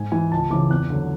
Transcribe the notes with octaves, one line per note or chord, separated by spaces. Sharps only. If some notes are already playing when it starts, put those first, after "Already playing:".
Already playing: G#2 G#5
E3 G#5
C#2 A5
C#3 E3 D6
E2 F#6
D3 F#3